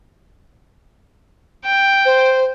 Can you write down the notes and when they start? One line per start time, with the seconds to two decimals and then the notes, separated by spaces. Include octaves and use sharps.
1.65 G5
2.05 C5